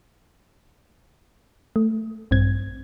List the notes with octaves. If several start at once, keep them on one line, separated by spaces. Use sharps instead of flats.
A3
A#1 G2 C4 G#6